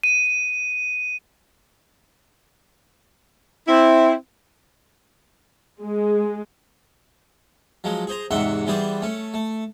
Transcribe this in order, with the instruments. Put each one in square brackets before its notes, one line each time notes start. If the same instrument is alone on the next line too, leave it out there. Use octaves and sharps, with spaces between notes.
[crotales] D#7
[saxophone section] C4 E4
[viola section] G#3
[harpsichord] F3 F#3 G#3
G#4 C5 A#5
E2 G#2 C3 E5 F#5 C6
E3 G3 B3 G#4 C5 D5
A3 C#4
A3